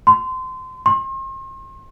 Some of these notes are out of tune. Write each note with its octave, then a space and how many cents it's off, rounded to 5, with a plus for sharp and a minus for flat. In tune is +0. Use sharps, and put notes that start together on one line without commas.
C6 -25
C6 +40